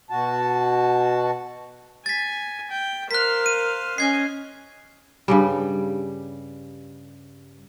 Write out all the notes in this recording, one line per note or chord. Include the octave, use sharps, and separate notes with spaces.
B2 F#4 A5
G#5 A6 B6
G5
A#4 C5 F5 F#6 B6
D#7
C#4 D#5 G#5 G#6 C7
G2 C#3 G3